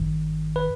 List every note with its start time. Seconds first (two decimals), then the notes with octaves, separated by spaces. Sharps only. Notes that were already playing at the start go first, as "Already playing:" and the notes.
Already playing: G#1 G2 D#3
0.56 B4